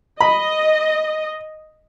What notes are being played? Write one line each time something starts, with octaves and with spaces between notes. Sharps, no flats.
D#5 B5